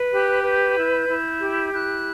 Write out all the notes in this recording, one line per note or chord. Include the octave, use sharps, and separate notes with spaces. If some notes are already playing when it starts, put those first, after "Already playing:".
Already playing: B4
G4 F#6
B4 G6
E4
E4
G4
E4 F#6